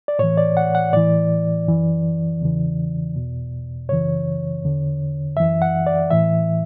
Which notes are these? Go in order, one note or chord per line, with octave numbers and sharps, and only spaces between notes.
D5
A2 E3 C#5
D5
F#5
F#5
A2 E3 D5
F#2 E3
E2 C#3 E3
E2 B2
F#2 C#3 E3 C#5
E2 D3
F#2 E3 E5
F#5
D5
A2 E3 E5